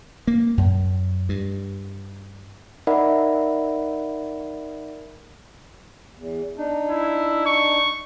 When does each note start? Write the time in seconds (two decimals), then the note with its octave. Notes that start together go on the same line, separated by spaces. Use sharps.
0.27 A#3
0.58 F#2
1.29 G2
2.87 D#4 A#4 D5 E5 F#5 B5
6.16 E2
6.57 D4 D#4
6.90 E4
7.46 C#6